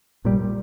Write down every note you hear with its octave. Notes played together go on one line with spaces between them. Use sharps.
A#1 A#2 G3